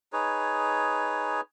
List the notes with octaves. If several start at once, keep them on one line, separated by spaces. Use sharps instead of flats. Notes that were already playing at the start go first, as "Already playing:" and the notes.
D#4 G#4 B4 C#5